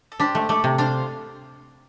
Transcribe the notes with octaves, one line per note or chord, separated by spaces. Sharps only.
A4
D4 G4 C5
A3
A3 A4 D5
C3
D4 C5 F5